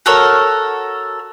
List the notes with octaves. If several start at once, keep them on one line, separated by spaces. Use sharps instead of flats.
F#4 A4 A#4 C#5